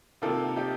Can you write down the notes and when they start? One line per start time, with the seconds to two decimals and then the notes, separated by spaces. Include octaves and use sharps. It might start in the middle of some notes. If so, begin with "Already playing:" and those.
0.22 C3 D#3 A#3 F4 A4
0.56 D#4 G4